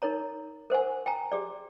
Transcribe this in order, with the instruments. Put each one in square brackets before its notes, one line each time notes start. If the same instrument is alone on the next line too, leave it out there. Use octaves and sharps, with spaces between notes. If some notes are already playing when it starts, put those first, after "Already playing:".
[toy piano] D#4 A#4 C#5 A#5
A#4 C5 F#5 G#5
G5 G#5 A#5
G4 G#4 D5